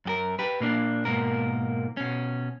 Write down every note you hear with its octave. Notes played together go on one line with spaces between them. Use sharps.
F#2 G4 A#4
G4 B4
A#2 A#3 D4
G#2 B2 A#3 A#4
B2 C#4